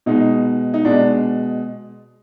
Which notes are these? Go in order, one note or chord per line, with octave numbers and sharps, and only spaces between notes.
B2 G#3 D#4
D#4
B2 G#3 D4